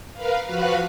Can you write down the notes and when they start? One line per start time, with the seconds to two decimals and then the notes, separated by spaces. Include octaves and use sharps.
0.13 A#4 B4 F5
0.46 F3 F#4 B4 F5 F#6